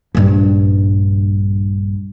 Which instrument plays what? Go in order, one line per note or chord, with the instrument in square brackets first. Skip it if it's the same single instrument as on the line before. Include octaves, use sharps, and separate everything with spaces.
[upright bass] A#1 G2